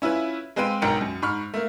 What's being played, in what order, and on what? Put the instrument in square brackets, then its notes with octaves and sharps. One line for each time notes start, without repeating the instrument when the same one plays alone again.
[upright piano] C#4 E4 F4 B4
G#3 C4 B4 F5 G5 D#7
B1 G#2 A#4 G5 C#7
F#2
G#2 B5 C#6 F6
A3 A#3